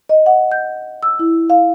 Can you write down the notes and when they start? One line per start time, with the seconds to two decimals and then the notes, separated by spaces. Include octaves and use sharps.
0.09 D#5
0.26 F#5
0.52 G6
1.03 E6
1.19 E4
1.50 F5